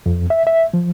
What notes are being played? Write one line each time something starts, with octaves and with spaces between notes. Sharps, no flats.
F2
E5
E5
F3